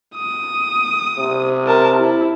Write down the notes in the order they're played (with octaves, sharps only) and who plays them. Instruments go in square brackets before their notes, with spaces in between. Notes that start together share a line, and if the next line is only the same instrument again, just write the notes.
[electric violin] D#6
[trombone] C3
[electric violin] A#4 A5
E4